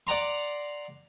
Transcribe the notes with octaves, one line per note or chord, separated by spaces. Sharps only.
D5 F#5 A#5 C6